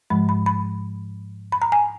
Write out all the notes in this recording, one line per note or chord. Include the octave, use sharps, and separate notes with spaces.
G#2 F3 G#3 B5
B5
B5
B5
A#5
G#5